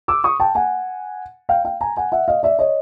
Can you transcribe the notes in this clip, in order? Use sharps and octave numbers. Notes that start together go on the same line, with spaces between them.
D6 E6
C#6 D#6
G5 A5
F#5 G#5
F5 G5
F5 G5
G#5 A#5
F#5 G#5
E5 F#5
D#5 F5
D5 E5
C#5 D#5